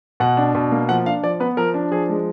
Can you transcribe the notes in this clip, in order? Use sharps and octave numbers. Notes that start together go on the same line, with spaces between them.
B2 F#5
D4
B2
A#3
F3 F#5
D4 F5
F3 D5
B3 B4
F3 A#4
D4
F3 G#4
G#3